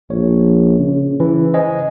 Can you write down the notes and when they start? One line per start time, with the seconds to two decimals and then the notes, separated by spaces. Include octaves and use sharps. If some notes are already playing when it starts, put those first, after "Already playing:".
0.10 A#1 C#5
0.79 C#3
1.20 E3
1.54 C5 D#5 G#5